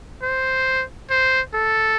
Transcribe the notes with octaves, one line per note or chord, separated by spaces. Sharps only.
C5
C5
A4